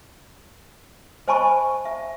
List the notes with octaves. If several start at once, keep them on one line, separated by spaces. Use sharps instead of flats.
C5 D#5 G#5 A5 B5 C#6
E5